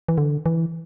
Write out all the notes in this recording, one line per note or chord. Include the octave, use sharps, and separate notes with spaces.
E3
D3
E3